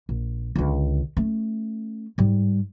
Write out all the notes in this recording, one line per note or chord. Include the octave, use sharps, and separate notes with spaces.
A#1
C#2 D3
A3 C#4
G#2 G3